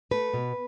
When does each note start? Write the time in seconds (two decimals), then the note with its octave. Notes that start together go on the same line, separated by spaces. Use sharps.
0.11 A3 B4
0.33 B2